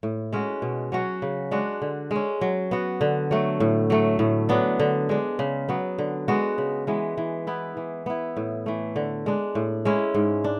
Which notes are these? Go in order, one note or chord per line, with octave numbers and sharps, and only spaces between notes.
A2
G#3 C#4 F#4
B2
F#3 C#4 F#4
C#3
G#3 D4 F#4
D3
G#3 C#4
F#3
B3 F#4
D3
F#3 A3
A2
F#3 A3
A2
F#3 B3 D4
D3
G#3 D4
C#3
F#3 B3
D3
G#3 B3 F#4
C#3
E3 G#3 B3
E3
B3 E4
E3
B3 E4
A2
E3 A3
D3
G#3 D4
A2
G#3 C#4 E4
G#2
D4